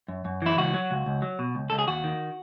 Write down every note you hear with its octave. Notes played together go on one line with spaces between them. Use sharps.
F#2
F#2
E3 E4
C#2 F#4
F#3
C#2
C#2
F#3
B2
C#2
C#2 A4
G#4
D#2 F#4
D#3